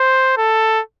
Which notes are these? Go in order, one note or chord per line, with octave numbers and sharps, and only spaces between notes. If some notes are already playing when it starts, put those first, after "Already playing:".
Already playing: C5
A4